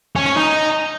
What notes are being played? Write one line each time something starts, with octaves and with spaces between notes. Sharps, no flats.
C#4
C#4
D#4